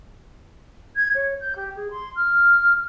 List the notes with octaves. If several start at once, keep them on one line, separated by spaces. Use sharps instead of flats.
G#6
C#5
G6
G4
G#4
C6
F6